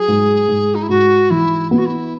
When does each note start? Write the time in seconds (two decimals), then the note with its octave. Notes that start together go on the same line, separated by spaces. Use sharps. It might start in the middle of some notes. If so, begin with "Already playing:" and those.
Already playing: F#3 G#4
0.08 G#2
0.48 G#2
0.75 D#4
0.82 E4
0.89 G#2 F#4
1.30 E3 E4
1.71 B3 E4
1.78 F#4
1.85 E4